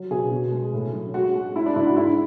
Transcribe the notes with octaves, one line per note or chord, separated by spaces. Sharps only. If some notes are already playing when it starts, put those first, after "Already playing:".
Already playing: F#3
B2 G#4
B2
G#3
A2
F#3
G#3 F#4
G#3
G#3 E4
D4
G#2 E4
F#4
G#3 E4